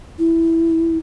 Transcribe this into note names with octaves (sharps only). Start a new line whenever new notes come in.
E4